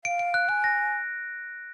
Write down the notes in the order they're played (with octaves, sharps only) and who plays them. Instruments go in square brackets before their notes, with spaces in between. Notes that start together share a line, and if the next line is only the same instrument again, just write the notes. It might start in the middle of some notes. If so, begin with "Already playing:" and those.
[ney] F5 [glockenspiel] D7
[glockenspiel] D7
F#6
[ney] G#5 [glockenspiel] F#6
[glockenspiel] A#6